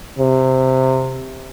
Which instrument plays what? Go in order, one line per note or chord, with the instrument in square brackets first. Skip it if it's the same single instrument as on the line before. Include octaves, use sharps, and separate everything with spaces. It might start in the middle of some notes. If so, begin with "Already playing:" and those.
[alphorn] C3